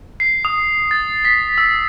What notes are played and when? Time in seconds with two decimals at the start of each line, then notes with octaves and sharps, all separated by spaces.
0.20 C7
0.45 D#6
0.91 A6
1.25 B6
1.58 E6